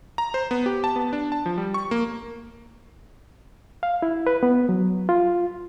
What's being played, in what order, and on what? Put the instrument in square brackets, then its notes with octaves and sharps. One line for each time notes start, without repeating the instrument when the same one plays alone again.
[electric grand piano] A#5
C5
B3
G4
A5
B3
D4
A5
F3
G3
C#6
A#3
[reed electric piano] F5
E4
B4
B3
F#3
F4